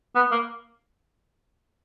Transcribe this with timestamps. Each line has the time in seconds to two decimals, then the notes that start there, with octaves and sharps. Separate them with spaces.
0.15 B3
0.31 A#3